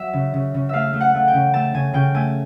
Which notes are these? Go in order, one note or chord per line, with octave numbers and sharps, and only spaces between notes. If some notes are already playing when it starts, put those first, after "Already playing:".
Already playing: F#3 E5
C#3
C#3
C#3
A3 E5 F5
A3
F#5
A3
G5
C#3
A3 A5
C#3 G#5
C#3 G5
A3 G#5